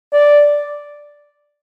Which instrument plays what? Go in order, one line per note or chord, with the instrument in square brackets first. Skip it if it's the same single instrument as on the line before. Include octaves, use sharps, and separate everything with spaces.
[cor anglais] D5